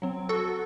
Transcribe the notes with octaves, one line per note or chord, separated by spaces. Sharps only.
F#3 C4
F#4 A4